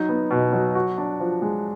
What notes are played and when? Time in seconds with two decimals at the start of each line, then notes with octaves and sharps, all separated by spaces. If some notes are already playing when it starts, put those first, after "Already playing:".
Already playing: F#3 D#4
0.09 B3
0.31 B2
0.53 F#3
0.75 F#4
0.98 D4
1.20 F3
1.42 G#3